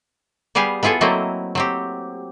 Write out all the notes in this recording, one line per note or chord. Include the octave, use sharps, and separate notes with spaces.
G3 B3 G4 G#4 F5
B3 E4 F4 G#4 A4
F#3 A3 A#3 C4 E4 D#5
F#3 C4 G4